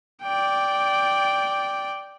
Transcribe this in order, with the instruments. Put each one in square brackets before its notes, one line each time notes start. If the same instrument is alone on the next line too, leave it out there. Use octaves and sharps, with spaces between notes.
[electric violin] D5 G5